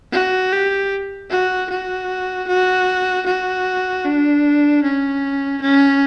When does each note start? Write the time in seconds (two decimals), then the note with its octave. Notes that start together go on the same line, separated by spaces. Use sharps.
0.12 F#4
0.52 G4
1.30 F#4
1.69 F#4
2.48 F#4
3.26 F#4
4.05 D4
4.83 C#4
5.62 C#4